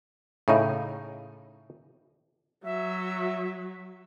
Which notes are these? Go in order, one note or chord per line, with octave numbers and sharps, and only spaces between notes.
A2 C#3 D#4 E5 F5 B5
F#3 E5